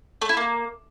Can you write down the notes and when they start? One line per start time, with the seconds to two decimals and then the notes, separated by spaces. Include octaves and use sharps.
0.22 A3
0.29 E4
0.37 A#3